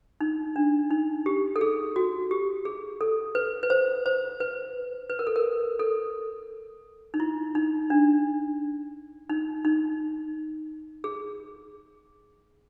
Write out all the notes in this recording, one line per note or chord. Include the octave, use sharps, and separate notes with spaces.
D#4
D4
D#4
G4
A4
G#4
F#4
G4
G#4
A4
B4
B4
C5
C5
B4
B4
A#4
A4
A#4
A4
D#4
E4
D#4
D4
D#4
D#4
G#4